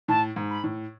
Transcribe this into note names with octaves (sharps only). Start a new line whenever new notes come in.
A2 A5
G#2
B5
A2